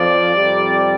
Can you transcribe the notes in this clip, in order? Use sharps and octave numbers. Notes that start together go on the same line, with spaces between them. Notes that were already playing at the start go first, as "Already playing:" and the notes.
Already playing: F2 F3 D5
F2 C3 G3